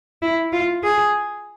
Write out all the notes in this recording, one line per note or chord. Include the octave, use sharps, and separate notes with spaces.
E4
F4
G#4